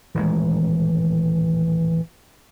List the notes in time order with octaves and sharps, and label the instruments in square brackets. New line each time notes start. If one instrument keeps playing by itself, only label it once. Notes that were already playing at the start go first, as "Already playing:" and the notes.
[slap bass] D#1 A1 G#3 [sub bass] E3